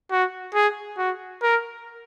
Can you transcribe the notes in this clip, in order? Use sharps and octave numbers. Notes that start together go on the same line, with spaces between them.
F#4
G#4
F#4
A#4